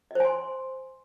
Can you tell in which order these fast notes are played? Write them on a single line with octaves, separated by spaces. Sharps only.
D#5 C5 G#5 C6